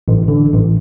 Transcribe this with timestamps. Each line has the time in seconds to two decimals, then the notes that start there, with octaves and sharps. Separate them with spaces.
0.08 A1
0.28 D3
0.53 A1